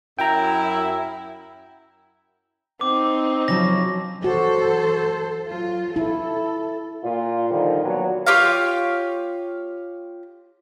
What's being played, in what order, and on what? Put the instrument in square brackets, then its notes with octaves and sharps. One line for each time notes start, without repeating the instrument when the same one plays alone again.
[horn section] F#2 E4 [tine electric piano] G5 A#5
[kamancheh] C4 D#4 [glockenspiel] D6
[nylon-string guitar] C#3 F3 F#3 [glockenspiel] A#6
[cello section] E3 A4 C5 [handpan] F#4
[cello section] F#3 F4
[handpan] E4 [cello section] A4
[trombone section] A#2 F4
D3 D#3 F3 G3 F4 A#4
A#2 F#3 A#3 B3
[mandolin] F4 G4 C#5 F5